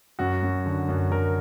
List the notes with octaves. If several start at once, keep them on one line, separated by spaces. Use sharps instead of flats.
F#2 F#4
F#2
D3
F#2
D3 A#4